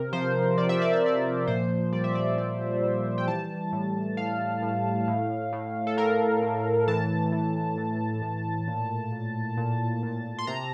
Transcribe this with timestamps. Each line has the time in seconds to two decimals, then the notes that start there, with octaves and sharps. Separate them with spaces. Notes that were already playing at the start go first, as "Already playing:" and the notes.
Already playing: C3 A#4
0.13 F3 C5
0.58 C3 D5
0.69 E5
0.82 D5
0.93 E5
1.02 F3 D5
1.48 A#2 C5
1.92 G3 D5
2.04 E5
2.15 D5
2.37 A#2 D5
2.83 G3
3.18 G5
3.27 E3 A5
3.72 A2
4.17 A2 F5
4.62 A2
5.08 A2
5.53 A2
5.87 A4
5.97 A2 A#4
6.42 A2
6.88 E3 A5
7.32 E3
7.77 E3
8.22 A2
8.67 A#2
9.12 A#2
9.57 A#2
10.03 A#2
10.39 C6
10.47 C3 A#5